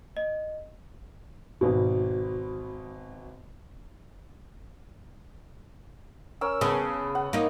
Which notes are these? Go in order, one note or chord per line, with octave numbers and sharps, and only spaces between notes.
D#5
G#1 B2
C#4 A#4 E6
C#3 B3 A5
F#5
A#3 D#4